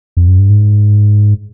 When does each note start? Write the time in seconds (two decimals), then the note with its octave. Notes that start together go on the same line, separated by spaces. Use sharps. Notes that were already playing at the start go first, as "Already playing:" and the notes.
0.17 F2
0.28 F#2
0.39 G2
0.50 G#2